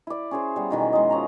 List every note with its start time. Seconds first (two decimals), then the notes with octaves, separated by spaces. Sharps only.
0.07 E4 D5
0.31 C#4 G#4 C5
0.56 G3 B3
0.71 B2 D#3 E3 F#3
0.93 G#3 D#5
1.10 F3 C#4 A#5